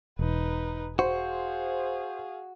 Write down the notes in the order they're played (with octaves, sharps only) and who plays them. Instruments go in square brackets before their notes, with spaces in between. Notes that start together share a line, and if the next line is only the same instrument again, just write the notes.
[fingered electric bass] E1 [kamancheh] D#4 B4
[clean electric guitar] F#4 [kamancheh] G#4 F5 [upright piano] C5